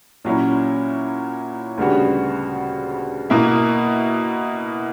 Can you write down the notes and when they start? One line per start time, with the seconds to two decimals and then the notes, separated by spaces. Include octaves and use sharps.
0.25 A#2 F#3 C#4 E4
1.78 D2 C#3 G3 B3 F#4
3.30 B2 A#3 E4